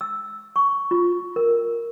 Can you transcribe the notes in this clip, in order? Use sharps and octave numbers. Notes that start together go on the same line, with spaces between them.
E6
C#6
F4
A#4